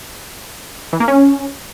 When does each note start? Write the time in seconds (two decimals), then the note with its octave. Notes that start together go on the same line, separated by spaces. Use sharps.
0.93 E3
1.00 A#3
1.08 C#4